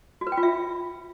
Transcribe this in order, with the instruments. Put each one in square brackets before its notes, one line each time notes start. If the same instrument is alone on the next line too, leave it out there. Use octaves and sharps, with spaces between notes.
[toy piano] F#4
B4
G5
F4
E5